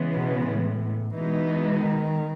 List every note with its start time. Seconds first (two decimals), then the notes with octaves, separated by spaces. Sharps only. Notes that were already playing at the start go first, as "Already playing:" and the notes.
Already playing: C#3 E3 G#3 B3
0.14 B2
0.47 A2
1.14 B2 E3 G#3 B3 D#4
1.82 D#3